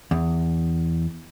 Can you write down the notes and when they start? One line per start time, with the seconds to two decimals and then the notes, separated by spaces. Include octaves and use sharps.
0.11 E2